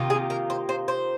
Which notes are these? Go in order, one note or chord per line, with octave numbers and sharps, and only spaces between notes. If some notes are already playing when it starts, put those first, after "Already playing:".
Already playing: C3 D#3 A#3 F4
G#4
A#4
C5
C5
C5